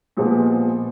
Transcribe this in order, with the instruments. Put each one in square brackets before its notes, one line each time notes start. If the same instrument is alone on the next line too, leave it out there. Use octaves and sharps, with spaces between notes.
[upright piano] A#2 F3 G#3 B3